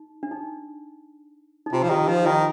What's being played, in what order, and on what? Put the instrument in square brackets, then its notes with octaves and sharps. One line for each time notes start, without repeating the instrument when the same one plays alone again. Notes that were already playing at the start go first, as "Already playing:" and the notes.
Already playing: [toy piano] D#4
D4
D#4
D#4
[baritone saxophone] C3 [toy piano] F4
[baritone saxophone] F3
[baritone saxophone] D#3 [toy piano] G4
[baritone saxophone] F3 [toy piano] D#4
[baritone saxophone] D#3 [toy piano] F4